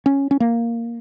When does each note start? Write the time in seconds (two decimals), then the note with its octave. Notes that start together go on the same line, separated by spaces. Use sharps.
0.06 C#4
0.31 C#4
0.40 A#3